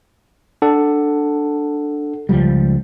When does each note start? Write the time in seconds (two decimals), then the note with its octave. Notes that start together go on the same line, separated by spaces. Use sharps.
0.62 D4 A4 F#5
2.29 C#2 F3 G3